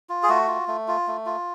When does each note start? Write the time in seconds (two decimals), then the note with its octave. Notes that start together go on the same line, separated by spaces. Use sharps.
0.09 F4
0.23 G#4
0.29 A3 F#4
0.48 F4
0.68 A3
0.88 F4
1.08 A3
1.26 F4